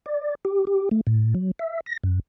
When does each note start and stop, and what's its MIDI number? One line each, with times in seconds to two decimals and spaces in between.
0.06 0.35 74
0.45 0.65 67
0.67 0.89 67
0.91 1.01 57
1.07 1.34 45
1.35 1.51 54
1.59 1.80 76
1.86 1.97 94
2.03 2.20 42